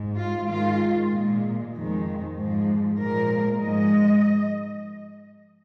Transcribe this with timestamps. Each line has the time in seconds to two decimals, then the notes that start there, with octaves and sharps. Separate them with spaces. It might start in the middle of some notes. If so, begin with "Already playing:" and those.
Already playing: G#2 G#3
0.18 F4
0.49 G#2 D#3 G#3 F4
1.11 A#2 G#3
1.74 F2 D#3 G#3
2.36 G#2 F3 G#3
2.98 A#2 F3 G#3 A#4
3.60 G#2 F3 G#3 D#5